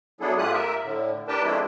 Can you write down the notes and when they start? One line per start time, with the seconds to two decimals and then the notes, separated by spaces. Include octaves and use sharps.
0.21 F#3 B3 D4 E4 G#4 A4
0.38 G#2 A3 F4 G4 D#6 F#6
0.53 A#4 E5
0.84 A2 D3
1.28 D4 G4 A#4 B4 G5 A5
1.43 F3 G#3 A3 C4 D4 E4